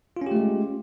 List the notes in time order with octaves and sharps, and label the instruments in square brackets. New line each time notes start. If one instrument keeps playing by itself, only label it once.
[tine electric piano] F4
C#4
G4
A3
G#3